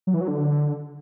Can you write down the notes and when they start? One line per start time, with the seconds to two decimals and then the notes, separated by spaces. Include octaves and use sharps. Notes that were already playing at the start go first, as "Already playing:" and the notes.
0.07 F#3
0.14 E3
0.21 F#3
0.28 D3